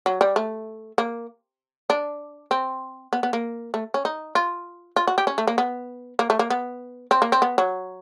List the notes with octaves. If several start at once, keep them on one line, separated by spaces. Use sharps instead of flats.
F#3
G3
A3
A#3
D4
C4
B3
B3
A#3
A3
C#4
D#4
F4
F4
F#4
G4
C#4
A3
A#3
B3
A#3
A3
A#3
B3
C4
A#3
C4
B3
F#3